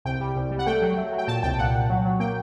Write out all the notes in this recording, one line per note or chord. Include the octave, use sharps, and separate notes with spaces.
C2 G5
G3
C2
G3
F#5
A3 G5
F#3
A3
F#3
G5
A#2 A5
C2 G5
A#2 F#5
A#2
F#3
F#3
A#3 G5